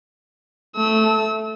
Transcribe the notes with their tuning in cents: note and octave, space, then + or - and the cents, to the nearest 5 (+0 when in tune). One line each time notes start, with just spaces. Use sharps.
A3 +0 E6 -35